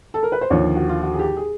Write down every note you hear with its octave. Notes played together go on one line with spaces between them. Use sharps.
A4
A#4
B4
C5
D#2 D3 F3 C#5
F#4
F4
F#4
G#4
G4
G#4